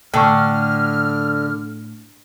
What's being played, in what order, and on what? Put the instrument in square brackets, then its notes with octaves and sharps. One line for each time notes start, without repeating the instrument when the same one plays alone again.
[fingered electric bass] A2 [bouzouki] D3 [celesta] G5 A5 C#6 [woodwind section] F6